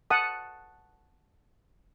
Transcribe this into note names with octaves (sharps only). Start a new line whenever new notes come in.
F#5 A5 D#6